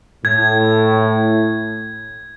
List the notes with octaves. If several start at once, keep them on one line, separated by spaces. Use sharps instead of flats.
A2 G#6